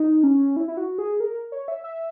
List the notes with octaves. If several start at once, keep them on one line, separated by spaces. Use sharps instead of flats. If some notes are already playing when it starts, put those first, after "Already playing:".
Already playing: D#4
C#4
E4
E4
F#4
G#4
A#4
C#5
E5
E5